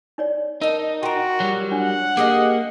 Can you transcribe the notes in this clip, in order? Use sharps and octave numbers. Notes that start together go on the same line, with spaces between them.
D#4 C#5 D5
D#4 A#4 D#5 A5
F4 F#4 A#4 G5 A#5
F#3 G3
D4 F#5
A#3 G4 G#4 D#5